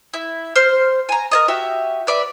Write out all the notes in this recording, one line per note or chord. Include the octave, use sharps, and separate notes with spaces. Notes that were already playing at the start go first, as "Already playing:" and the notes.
E4
C5 F6
G#5 A#5
A#4 D5 D#5
F#4 G4 E5
B4 D5 E5